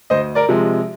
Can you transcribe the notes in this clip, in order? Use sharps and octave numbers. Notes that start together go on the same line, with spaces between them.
D2 C5 D#5
A#4 D5
C3 F3 G#3